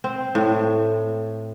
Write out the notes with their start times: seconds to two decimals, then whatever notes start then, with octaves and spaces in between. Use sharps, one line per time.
0.04 C4
0.35 A2